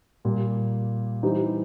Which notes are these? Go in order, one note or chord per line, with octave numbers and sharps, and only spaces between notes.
A#2 G3 A#3
E3 G3 C4 D#4 G4